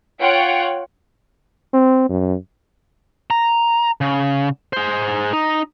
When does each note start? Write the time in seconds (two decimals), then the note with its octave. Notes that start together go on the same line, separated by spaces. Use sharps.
0.20 F4 C#5 F#5 G5 D7
1.74 C4
2.09 F#2
3.30 A#5
4.01 C#3
4.73 G#4 C5
5.33 D#4